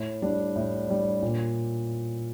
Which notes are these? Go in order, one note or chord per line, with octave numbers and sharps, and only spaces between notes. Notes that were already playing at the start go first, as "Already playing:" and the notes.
Already playing: A2
G3 D4
A2
G3 D4
A#2